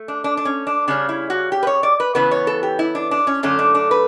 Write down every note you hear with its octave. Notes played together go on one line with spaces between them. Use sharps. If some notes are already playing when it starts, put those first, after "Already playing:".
Already playing: A3
D4
D4
D4
C#4
D4
C#3 G3 C#4 D4
E4
F#4
G4
B4
C#5
D5
B4
C#3 E3 B3 B4
C#5
A4
G4
E4
D4
D4
C#4
F#2 D3 A3 C#4
D4
D4
B4